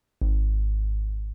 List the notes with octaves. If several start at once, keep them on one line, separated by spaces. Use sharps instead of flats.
G#1